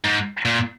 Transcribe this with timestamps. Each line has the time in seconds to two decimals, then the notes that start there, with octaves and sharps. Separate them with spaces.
0.04 G#2
0.45 A#2